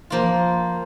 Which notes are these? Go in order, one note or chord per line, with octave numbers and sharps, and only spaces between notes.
F3 A#3 F4